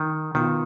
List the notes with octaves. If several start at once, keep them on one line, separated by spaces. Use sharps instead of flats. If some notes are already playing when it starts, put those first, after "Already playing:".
Already playing: D#3
B2 D#3 B3 F4